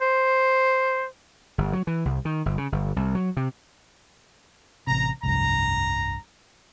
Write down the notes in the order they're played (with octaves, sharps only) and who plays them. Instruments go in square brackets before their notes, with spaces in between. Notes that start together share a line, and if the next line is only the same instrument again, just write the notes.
[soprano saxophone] C5
[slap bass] G1
F#3
E3
C2
D#3
G1
C#3
G1
C2
F#3
C3
[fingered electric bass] A1 C3 [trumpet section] A#5
[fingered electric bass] F1 C2 G2 [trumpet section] A#5